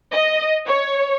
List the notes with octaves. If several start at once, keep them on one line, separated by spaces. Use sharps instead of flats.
D#5
C#5